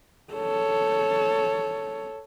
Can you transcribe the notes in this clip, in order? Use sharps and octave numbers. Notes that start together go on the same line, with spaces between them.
A4 C#5